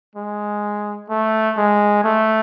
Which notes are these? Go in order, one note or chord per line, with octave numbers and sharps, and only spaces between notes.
G#3
A3
G#3
A3